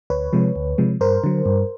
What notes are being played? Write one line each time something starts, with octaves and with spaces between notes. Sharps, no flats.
D2 B4 C#5
C3 F3 G#3
D2
C3 F3 G#3
G2 A#4 C5
D3 F#3
G2